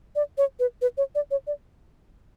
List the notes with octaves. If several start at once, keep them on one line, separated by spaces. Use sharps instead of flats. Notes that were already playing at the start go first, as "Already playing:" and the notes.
D5
C#5
B4
B4
C#5
D5
C#5
D5